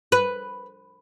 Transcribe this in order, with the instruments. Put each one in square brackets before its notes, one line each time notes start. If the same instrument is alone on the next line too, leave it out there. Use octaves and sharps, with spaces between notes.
[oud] B4